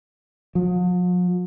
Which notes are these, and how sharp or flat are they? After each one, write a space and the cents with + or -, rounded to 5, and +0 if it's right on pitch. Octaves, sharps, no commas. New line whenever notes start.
F3 +45